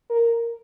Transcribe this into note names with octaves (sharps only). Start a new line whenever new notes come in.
A#4